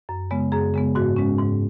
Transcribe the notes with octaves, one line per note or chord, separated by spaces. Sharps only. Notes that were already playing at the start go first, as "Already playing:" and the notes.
F#2
C#3 G#3 B3
F#2 G#4
C#3 G#3 B3
G#2 F#4
G#3 C#4
G#2